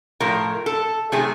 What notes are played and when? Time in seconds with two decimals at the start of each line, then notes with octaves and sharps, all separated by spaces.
0.20 A2 F3 A3 A#4
0.66 A4
1.12 C3 D#3 F#3 A3 G#4